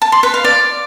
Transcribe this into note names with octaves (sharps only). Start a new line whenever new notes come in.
A5
C6
B4
F5
D5